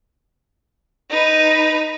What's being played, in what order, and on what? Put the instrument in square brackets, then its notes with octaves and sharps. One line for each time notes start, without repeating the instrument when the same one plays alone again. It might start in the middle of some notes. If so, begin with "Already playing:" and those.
[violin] D#4 B4